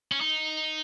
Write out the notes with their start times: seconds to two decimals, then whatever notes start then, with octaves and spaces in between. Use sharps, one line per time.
0.12 C#4
0.21 D#4